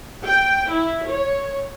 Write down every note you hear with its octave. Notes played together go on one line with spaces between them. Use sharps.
G5
E4
C#5